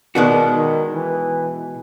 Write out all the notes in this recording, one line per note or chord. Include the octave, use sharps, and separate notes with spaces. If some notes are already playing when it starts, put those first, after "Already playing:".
B2 D#3 G#3 B3 D4 F#4
D#3
E3